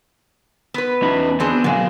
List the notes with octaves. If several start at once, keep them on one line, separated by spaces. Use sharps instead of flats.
B3 B4
E2 C#4 D#4 F#4 B5
B3 C4 D4 G#4
B2 D3 F#3 G#3 A#3 F5